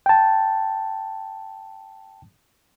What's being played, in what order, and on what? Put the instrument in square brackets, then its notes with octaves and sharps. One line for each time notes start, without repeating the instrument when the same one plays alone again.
[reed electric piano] G5 A5